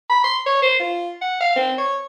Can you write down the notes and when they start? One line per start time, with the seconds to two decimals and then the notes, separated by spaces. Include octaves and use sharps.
0.10 B5
0.24 C6
0.46 C#5
0.62 C5
0.80 F4
1.21 F#5
1.41 F5
1.56 C4
1.78 C#5